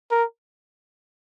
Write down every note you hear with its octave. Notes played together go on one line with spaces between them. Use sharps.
A#4